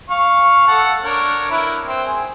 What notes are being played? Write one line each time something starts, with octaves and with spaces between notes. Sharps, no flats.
F5 C#6
A4 F#5 A5
D4 A#4 C#5
E4 A#4 B4
C4
G#4